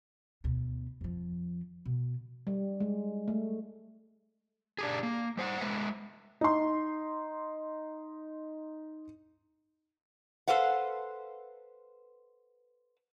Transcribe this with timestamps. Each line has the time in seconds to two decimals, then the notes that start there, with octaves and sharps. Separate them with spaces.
0.44 D2 B2
1.01 F2 F3
1.86 B2
2.47 G3
2.80 G#3
3.28 A3
4.78 D4 G4 G#4
5.03 A#3
5.37 G3 C5 F#5
5.60 G#3 A#3 B4 E5 F#5
6.41 D#4 C6
10.48 A4 B4 C5 F5 F#5